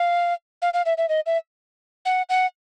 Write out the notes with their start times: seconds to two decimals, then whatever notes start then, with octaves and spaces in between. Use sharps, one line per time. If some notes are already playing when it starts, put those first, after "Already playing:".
Already playing: F5
0.62 F5
0.74 F5
0.86 E5
0.98 E5
1.09 D#5
1.26 E5
2.05 F#5
2.29 F#5